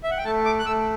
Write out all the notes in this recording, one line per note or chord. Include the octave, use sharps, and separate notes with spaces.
E5
F#5
G5
A3 A5
D6
F#6
A3 E6